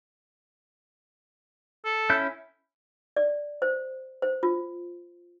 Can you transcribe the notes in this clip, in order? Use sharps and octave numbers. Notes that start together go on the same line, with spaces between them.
A4
C#4 E4 G6
D5
C5
C5
F4